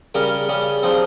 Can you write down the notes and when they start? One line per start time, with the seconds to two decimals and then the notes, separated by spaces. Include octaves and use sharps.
0.15 C#3 G3 C#4 A#4
0.48 C#3 G3 C#4
0.83 F3 C4 D#4